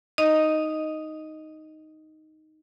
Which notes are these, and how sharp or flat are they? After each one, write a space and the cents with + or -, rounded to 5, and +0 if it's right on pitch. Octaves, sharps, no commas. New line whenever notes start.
D#4 +0 D#5 +0